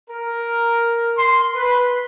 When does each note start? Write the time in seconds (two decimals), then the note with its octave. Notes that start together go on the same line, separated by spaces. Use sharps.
0.10 A#4
1.18 C6
1.55 B4